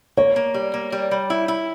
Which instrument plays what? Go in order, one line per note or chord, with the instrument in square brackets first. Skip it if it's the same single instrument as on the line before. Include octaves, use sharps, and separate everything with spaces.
[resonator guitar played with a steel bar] A#3 [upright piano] C#5
[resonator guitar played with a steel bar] A#3
G3
A#3
G3
G3
E4
E4